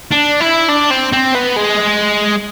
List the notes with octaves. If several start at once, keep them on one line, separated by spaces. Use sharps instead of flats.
D4
E4
D4
C4
C4
B3
G#3